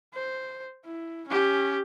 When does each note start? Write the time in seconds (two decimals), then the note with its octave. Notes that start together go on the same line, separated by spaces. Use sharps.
0.14 C5
0.85 E4
1.28 C#4 G4